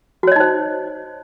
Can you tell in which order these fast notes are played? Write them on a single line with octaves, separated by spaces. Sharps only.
F#4 C#5 D#5 D#4 C5